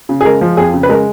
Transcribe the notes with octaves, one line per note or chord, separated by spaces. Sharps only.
C#3
G#4
G#3 A#4
F3
F2 G#4
C#3
B4
G#3 A#4